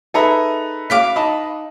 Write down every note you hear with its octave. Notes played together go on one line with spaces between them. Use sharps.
D#4 G#4 A4 B4 E5 A#5
C#4 F#4 B4 F5 D6 B6
D#4 D#5 A5 B5